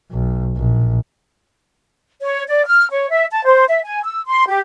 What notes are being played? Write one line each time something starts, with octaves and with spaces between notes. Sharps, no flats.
B1
A#1
C#5
D5
F6
C#5
E5
A5
C5
E5
G#5
E6
C6
G4